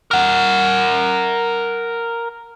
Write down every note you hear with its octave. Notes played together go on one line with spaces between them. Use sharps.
A#4 F#5